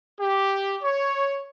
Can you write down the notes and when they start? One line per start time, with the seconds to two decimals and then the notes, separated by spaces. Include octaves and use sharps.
0.20 G4
0.83 C#5